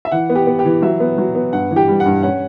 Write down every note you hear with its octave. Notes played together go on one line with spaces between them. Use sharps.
E5
E3 F#5
B3
G4 G5
B3
G4 G5
E3
F#3 E5
B3
F#3
B3
G2 F#5
E3
G4 G5
G3
F#5
G2
C#4 F#5